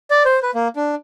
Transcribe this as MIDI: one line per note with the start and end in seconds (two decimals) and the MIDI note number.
0.11 0.23 74
0.25 0.39 72
0.43 0.51 71
0.55 0.68 58
0.76 0.95 62